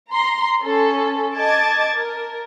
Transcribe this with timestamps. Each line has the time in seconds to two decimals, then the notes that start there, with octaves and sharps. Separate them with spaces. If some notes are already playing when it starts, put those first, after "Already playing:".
0.11 A#5 C6
0.63 C#4 A4
1.36 D#5 A5 D6 G#6 A6
1.94 A#4